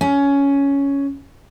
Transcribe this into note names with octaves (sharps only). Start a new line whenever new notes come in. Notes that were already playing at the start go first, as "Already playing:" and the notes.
C#4